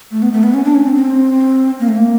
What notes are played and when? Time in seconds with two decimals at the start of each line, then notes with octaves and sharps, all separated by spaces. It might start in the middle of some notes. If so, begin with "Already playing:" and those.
0.12 A3
0.22 B3
0.33 A3
0.44 B3
0.54 C#4
0.65 D4
0.75 C#4
0.85 C4
0.96 C4
1.80 A#3
1.88 A3
1.97 A#3